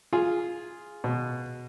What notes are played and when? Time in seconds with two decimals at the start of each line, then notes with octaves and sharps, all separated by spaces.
0.13 F4 G#4
1.04 B2